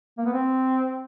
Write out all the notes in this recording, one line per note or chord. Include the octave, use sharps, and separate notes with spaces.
A#3
B3
C4